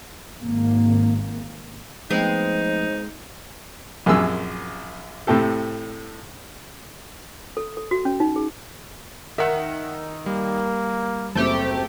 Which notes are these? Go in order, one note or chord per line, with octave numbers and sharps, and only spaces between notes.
G#1 A#3
F3 G#3 A3 B3 C4 D#4 C5
A#1 F#2 C3 G#4 E6
A2 C3 A3 G4 A4
A4
A4
F#4
C#4
D#4
G#4
D#3 A#4 E5 F#5 E6
G3 A#3
F#1 A3 C4 G4